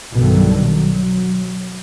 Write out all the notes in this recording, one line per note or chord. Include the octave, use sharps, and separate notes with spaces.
B1 G2 B2 D3 D#3 F#3
F#3